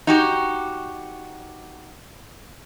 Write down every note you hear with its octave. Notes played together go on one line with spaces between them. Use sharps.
D#4 F#4 G4